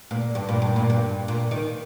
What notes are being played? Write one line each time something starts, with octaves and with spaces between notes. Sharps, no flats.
A#2
G2
A#2
G2
A#2
G2
A#2
D#3